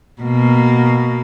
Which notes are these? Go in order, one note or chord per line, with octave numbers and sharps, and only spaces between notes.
B2 A#3